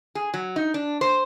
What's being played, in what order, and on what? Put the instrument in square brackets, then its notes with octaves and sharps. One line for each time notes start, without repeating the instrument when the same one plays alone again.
[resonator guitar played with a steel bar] G#4
F#3
D#4
D4
C5